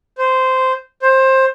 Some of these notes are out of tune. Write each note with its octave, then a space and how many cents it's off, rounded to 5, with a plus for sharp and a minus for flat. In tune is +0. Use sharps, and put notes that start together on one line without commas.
C5 -10
C5 +20